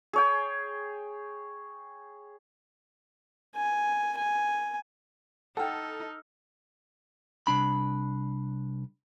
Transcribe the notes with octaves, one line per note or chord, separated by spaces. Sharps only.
G#4 C#5 G5
G#5
G#5
D#4 A4 F#5 G5 E6 F6
C2 D4 B5